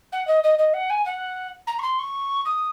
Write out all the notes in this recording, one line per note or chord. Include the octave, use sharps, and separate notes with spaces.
F#5
D#5
D#5
D#5
F#5
G#5
F#5
A#5
C#6
C6
C#6
D#6